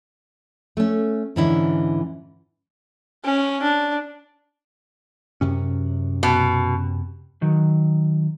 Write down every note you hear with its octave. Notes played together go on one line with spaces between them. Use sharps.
A3 C#4
G#2 D3 E3 C#4 E4
C#4
D4
F#2 C3 C#4
B2
D#3 F#3